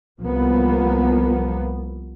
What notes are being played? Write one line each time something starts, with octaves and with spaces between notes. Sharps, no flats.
C2 F3 A#3 B3